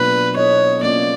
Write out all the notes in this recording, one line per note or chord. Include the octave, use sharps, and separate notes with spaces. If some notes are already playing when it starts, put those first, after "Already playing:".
Already playing: B2 F#3 A#3 D4 F4 B4
B3 E4 A4 C5 C#5 D#5
A#3 C#4 F4 D5